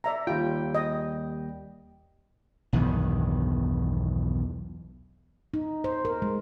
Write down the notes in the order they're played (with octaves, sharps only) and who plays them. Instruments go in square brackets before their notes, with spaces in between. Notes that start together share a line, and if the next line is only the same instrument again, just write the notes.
[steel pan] D5 E5 A#5
[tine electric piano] D#2 G3 G5 [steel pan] F4
[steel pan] D#5
[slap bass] B1 E2 G2 D#3
[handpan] D#4
C5
A#4
G#3